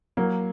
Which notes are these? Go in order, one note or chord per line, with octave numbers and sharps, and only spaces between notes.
F#3 A#3